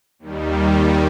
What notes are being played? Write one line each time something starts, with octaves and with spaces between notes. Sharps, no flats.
D#2 D#3 G3